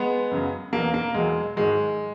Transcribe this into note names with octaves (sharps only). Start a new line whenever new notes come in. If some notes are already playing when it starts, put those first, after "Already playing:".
Already playing: G#3 B3
F#2 C#3 F#3
E2 B2 F#3 A#3
A#3
E2 B2 F#3 G#3
G#2 D#3 F#3 G#3